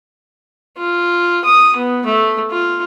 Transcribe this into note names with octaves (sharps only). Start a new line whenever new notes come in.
F4
D#6
B3
A3
F4